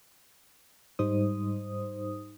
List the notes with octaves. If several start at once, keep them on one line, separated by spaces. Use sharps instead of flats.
G#2 G3 D#4 C5 D#6